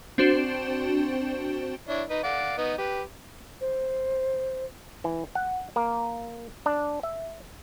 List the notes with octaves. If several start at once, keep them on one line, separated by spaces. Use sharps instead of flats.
C4 D4 F#4 C5 D7 E7
D4 E4 C#5
D#4 B4
D5 F5 F#5
B3 D#4
G4 B4
C5
E3
F#5
A#3
D4
E5